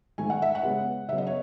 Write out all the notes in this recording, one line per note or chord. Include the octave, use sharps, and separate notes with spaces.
G#2 D#3 A3 G#5
F#5
E5
F#5
C#3 G#3 B3
C#3 F#3 B3 E5
D#5
C#5